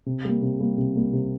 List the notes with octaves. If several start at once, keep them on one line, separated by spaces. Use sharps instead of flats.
C3
G3 A#3
C3
G3 A#3
C3
G3 A#3
C3